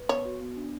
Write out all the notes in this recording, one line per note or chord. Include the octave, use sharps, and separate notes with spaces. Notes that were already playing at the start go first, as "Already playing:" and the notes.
Already playing: B4
B3 C#5
F#4
B3
D4